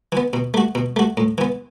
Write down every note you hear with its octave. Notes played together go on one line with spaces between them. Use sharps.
E3 B3
B2
A3 F#4
B2
A3 F#4
A2
E3 B3